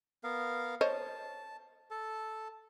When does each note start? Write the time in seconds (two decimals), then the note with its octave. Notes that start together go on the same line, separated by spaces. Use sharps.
0.24 B3 A#4 F5
0.81 C5 C#5 D#5 A5
1.91 A4 A5